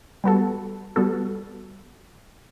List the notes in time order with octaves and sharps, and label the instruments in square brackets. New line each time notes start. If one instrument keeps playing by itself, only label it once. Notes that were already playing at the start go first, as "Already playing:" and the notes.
[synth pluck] G3 B3 F#4 A4
G3 B3 F#4 A4